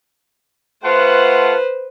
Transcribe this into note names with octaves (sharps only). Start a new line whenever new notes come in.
A3 F4 B4 C5 F#5